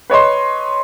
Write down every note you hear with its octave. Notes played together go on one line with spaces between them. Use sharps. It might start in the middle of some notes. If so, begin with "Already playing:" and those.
B4 C#5 D#5 C6